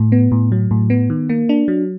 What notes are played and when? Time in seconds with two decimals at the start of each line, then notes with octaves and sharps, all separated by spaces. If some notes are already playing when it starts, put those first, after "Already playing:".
Already playing: A2
0.12 B3
0.32 A2
0.52 F#3
0.71 A2
0.90 B3
1.10 D#3
1.29 A#3
1.49 D4
1.68 F#3